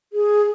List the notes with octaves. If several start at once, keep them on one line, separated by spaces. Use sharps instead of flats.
G#4